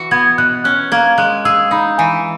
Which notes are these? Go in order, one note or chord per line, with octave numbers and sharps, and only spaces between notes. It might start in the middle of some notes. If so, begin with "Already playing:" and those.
Already playing: E3 F#4
B3 G#6
B2 F#6
C#4 F#6
A#3 G#6
G#3 F#6
G#4 E6
D#4 B5
E3 G#5